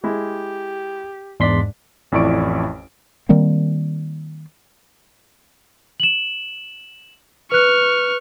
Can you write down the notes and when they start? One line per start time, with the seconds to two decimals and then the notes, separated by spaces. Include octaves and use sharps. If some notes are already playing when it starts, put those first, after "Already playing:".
0.04 G#3 E4 G4
1.40 E2 G#2 D4 D5 C6 B6
2.12 A1 F2 E4 D5 C#6 D7
3.29 D#3 G3 A#3 C4
6.00 E7 F#7
7.52 B4 C#6 F6 F#6